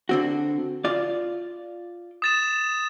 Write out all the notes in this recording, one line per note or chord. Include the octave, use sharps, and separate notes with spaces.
D3 C4 F#4
F4 D5
D#6 A6 E7